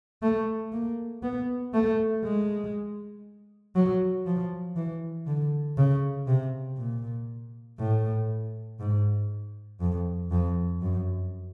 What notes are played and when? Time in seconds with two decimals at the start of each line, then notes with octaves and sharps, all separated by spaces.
0.22 A3
0.72 A#3
1.23 B3
1.74 A3
2.24 G#3
3.76 F#3
4.26 F3
4.76 E3
5.27 D3
5.78 C#3
6.28 C3
6.78 A#2
7.79 A2
8.80 G#2
9.81 F2
10.31 F2
10.82 F#2